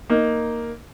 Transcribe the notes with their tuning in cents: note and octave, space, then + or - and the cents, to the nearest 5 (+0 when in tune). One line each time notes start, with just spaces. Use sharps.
A#3 +0 D#4 +0